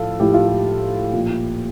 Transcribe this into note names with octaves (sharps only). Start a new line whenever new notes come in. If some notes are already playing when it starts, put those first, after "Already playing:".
Already playing: A2 F3 A4 F5
A2 F3 G4
F4
G4
A#2 F3